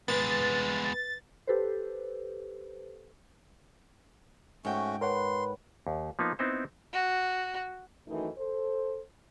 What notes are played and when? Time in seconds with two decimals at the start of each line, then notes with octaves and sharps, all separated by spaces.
0.08 G#3 B3 B4 A6
1.47 G4 A4 B4 C5
4.65 G#2 A3 C#4 F#4 G5
5.01 A#4 B4 C#5 F#5 C6
5.87 D#2
6.19 F3 A#3 B3 D#4
6.39 B3 C4 D#4 E4 C5
6.93 F#4
8.08 F#2 D#3 E3 A3 D#4
8.38 A4 C5